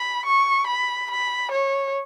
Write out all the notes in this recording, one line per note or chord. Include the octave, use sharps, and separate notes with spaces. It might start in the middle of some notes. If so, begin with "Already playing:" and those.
Already playing: B5
C#6
B5
B5
C#5